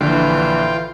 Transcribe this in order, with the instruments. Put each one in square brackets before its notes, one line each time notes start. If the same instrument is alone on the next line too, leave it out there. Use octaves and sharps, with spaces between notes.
[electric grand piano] A#1 D3 [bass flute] E3 [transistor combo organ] F4 G5